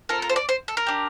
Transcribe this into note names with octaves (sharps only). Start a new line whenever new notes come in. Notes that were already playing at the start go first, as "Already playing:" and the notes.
C4 F4 A4 A#4
A#4
C5
D5
C5
A4
A#4
D4 G4